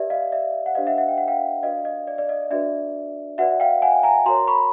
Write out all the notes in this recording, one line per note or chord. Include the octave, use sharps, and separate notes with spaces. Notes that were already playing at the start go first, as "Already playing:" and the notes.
Already playing: G4 B4 D5 E5
D#5 F5
D5 E5
F#5
D4 G4 C5 D#5 F5
E5 F#5
E5 F#5
G5
F#5
F5 G5
D4 F#4 B4 D5 D#5 F5
D#5
D5
D5
D#5
D4 F#4 B4 D5 E5
F#4 B4 D5 E5 F#5
F5 G5
F#5 G#5
G#5 A#5
F#4 A#4 C#5 A#5 C6
B5 C#6